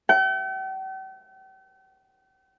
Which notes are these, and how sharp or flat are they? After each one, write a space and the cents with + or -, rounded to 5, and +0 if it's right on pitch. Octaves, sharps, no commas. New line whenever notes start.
G5 -45